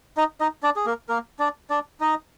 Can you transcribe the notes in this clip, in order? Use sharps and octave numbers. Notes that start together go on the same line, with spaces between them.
D#4 D#5
D#4 D#5
D4 D5
G#4
A#3 A#4
A#3 A#4
D4 D5
D4 D5
D#4 D#5